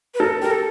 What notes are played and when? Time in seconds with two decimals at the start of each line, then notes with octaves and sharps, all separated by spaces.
0.14 B4
0.20 A4 A#4
0.42 G4 A#4
0.51 A4